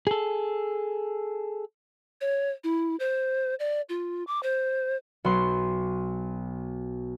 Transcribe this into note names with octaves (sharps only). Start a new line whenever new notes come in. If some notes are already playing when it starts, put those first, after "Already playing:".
G#4 A4
C#5
E4
C5
D5
F4
D6
C5
B1 F#4 B5 C6